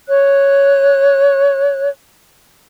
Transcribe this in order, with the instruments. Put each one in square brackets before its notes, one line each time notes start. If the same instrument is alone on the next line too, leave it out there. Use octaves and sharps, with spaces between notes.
[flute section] C#5 F#6